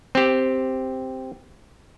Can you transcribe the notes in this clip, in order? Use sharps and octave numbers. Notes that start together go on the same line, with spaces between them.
C4 G4